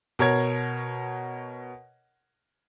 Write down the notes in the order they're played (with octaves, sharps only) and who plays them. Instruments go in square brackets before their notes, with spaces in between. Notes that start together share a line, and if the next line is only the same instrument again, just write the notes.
[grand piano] B2 A#4 C#5 G#6